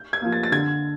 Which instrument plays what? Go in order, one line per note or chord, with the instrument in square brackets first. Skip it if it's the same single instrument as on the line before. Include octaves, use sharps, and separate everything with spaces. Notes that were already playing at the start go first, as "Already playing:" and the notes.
Already playing: [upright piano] G6
G#6
F3 A#3
A6
A6
D3 G#6